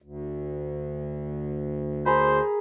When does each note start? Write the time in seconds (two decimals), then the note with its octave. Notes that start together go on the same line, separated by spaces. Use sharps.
0.02 D2
2.06 G#4 A#4 C5 B5